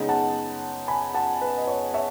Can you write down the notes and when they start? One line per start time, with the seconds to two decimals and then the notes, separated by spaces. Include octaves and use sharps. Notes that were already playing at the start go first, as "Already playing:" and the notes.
Already playing: C#3 G#3 B3 D#4
0.09 F#5 A5
0.88 G#5 B5
1.14 F#5 A5
1.41 B4
1.58 D#5
1.67 C#5
1.94 C#5 E5